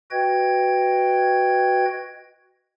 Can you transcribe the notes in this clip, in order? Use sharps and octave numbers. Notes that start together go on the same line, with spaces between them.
F#4 B4 D#5 G5 G#6